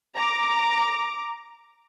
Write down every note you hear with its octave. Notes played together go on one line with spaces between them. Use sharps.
A#5 D6